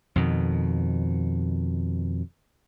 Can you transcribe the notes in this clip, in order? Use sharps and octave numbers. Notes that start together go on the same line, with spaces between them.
F2 B2 D#3